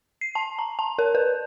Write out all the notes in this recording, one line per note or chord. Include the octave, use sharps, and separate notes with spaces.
C7
A5
A#5
A5
A#4
B4